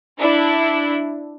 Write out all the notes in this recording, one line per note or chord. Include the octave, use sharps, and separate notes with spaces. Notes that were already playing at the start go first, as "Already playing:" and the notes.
D4 E4